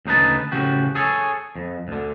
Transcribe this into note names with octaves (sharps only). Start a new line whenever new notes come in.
D2 C#3 D#4 B4 A5
A2 C#3 F#4 G4
G#4 A4 C#5
F2
D2 D3